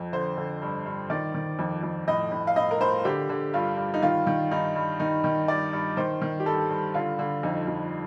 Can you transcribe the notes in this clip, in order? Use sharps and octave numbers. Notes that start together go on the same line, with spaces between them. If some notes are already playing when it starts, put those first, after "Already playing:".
Already playing: F2
D3 C5
D3
G2
G2
D#3 D5
D#3
F2
F2
A2 D#5
A2
F5
A2 D#5
A#4
A2 C5
D3 G4
D3
G2 F4
G2
D#4
D#3 F4
D#3
G2 D#4
G2
D#3 D#4
D#3
G2 D5
G2
D#3 C5
D#3
G4
G2 A4
G2
D3 F4
D3
F2 D#4
F2